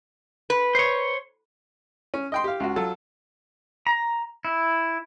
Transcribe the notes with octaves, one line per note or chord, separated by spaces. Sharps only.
B4
C5 C#5
C#4
D#5 G5 C6
G4 F5
C#2 F#4
F#3 F4 A4
A#5
E4